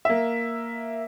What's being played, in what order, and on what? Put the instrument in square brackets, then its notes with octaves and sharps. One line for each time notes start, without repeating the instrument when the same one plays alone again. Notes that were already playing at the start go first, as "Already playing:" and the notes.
[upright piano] A#3 E5